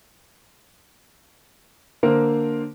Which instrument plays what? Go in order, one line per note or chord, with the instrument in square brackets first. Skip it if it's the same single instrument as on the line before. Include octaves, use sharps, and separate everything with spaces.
[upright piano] D3 A#3 A#4 C5